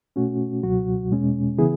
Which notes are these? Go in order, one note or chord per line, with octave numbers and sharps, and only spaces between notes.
B2 A3 C#4 F#4
C#2 B2 F#3 F#4
E2 B2 G#3 C#4
C#3 E3 B3 E4 G#4